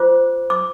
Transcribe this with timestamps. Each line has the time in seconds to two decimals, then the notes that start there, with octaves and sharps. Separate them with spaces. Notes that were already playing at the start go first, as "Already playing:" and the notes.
Already playing: F4 C5 D6
0.50 D6